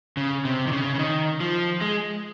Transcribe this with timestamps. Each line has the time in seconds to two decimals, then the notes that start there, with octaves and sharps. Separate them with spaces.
0.17 C#3
0.45 C3
0.67 D#3
0.72 C#3
0.95 C#3
0.99 D#3
1.40 F3
1.81 G#3